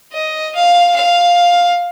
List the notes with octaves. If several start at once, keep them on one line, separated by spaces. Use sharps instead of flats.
D#5
F5
F5